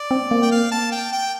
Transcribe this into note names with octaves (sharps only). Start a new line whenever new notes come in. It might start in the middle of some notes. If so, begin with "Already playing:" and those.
Already playing: D5
C4
A#3
G5
F5
A5
G5
G5